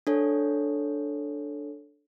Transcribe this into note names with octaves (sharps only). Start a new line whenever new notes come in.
D4 A4 C#5